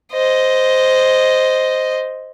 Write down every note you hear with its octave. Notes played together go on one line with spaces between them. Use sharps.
C5 D#5